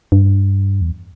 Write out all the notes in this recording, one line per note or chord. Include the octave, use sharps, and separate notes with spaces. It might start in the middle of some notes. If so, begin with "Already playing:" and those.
G2
E2